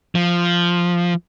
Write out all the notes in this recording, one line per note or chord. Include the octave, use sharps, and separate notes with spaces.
F3